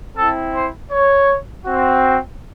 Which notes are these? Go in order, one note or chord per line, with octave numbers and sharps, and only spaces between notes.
C4 E4 A4
C5
C#5
C4 F#4